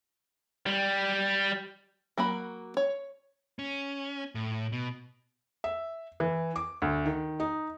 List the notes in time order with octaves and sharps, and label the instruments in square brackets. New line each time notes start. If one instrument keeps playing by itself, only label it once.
[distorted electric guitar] G3
[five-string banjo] F#3 A#3 F#4 B5
C#5
[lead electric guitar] C#4
A2
B2
[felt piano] E5
E3
D6
D2
D#3
D#4